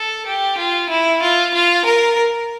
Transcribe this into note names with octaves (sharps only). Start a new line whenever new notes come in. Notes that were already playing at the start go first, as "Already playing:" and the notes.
Already playing: A4
G4
F4
E4
F4
F4
A#4